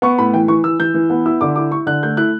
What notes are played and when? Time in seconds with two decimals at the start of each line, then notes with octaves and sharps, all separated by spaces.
0.02 B3 C#6
0.18 A2 B5
0.34 E3 G5
0.48 E3 C#6
0.64 E3 E6
0.79 E3 G6
0.94 E3
1.10 B3
1.26 E4 E6
1.41 D3 D6
1.56 E4 D6
1.71 E4 C#6
1.86 D3 F#6
2.03 A3 G6
2.17 E4 F#6